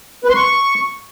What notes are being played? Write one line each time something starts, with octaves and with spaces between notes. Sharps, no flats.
B4
C6
C#6